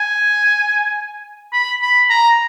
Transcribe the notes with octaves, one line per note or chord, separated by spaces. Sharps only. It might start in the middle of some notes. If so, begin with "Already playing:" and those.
Already playing: G#5
B5
B5
A#5